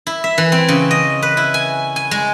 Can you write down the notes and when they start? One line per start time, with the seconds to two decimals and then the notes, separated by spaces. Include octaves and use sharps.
0.07 E4
0.24 E5
0.38 E3
0.52 C4
0.68 C#3
0.91 D#5
1.22 B4
1.37 E4
1.54 G#5
1.96 G#5
2.11 G#3